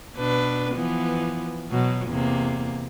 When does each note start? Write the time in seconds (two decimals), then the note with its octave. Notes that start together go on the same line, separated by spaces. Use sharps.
0.16 B2 D4 B4
0.74 E3 F3 B3
1.69 B2 F#3
2.08 E2 C3 A#3